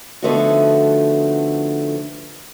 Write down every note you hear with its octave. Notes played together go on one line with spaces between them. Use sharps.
D3 F3 A3 B3 D#4 F#4